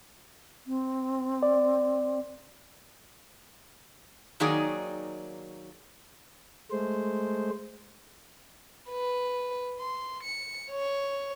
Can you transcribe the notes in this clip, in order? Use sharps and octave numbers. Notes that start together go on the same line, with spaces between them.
C4
D5
D#3 F#3 A#3 D#4 G#4 D5
G#3 A3 C5
B4
C6
C#7
C#5